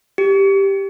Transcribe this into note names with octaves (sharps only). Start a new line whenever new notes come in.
G4